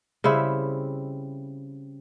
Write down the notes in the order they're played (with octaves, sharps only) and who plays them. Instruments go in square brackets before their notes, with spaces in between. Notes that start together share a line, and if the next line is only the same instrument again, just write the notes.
[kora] C#3 G3 C4 E4